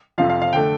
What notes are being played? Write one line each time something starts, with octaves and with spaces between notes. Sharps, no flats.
F2 C3 F3 F5
F5
F5
D3 A3 G5